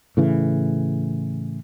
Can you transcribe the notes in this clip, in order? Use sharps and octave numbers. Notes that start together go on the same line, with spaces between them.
A2 C#3 E3